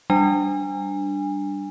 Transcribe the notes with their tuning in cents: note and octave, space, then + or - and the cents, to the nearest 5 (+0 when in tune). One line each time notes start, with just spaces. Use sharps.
G3 +0 D4 +0 G#5 -30